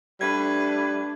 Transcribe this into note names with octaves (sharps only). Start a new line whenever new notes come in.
G3 A3 D4 B4 G#6